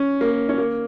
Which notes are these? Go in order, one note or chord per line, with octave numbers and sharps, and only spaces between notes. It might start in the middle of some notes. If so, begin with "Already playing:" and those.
Already playing: C#4
A#3
C#4
A#3